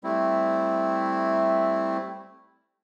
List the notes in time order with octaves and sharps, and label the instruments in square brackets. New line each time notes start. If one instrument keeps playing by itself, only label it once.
[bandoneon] G3 A3 C4 E4